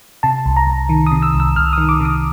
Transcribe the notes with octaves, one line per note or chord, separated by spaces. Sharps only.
C3 A5
C2
A#5
C2
D#3
C3 D#6
E6
C2
E6
C2 F6
D#3 D#6
D6
C3 D#6